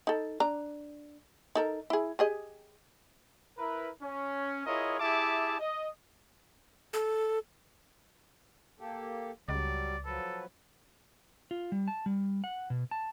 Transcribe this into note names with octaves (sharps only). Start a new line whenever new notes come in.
D#4 A4
D4 A#5
D#4 A4 A#4
E4 G#4
G4 G#4 D#5
E4 A#4 B4
C#4
E4 F4 G#4 A#4 C#5 D#5
E4 G4 G#4 E5 A5 D6
D#5
A4
A#3 G4 A4
C#2 F#3 G3 D5
F3 F#3 A4 B4
F4
G3
A5
G3
F#5
B2
A5